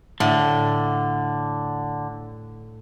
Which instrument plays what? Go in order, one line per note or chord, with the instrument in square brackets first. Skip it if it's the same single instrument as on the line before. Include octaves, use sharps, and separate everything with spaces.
[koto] A2 [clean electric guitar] D3